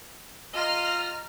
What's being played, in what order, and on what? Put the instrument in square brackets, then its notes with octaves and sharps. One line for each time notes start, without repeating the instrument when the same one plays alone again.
[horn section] F4 D#5 [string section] A#5 F6